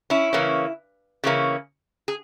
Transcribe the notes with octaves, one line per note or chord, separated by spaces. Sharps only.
C#4 E4
C#3 E3 A#3 C#4
C#3 E3 A#3 C#4
G#4